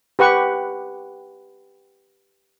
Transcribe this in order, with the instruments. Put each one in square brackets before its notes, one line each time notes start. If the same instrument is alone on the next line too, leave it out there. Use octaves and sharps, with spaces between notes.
[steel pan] G4 B4 F#5 C#6